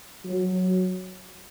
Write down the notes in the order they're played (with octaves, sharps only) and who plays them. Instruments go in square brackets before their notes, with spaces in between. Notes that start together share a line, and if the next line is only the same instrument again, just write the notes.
[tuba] F#3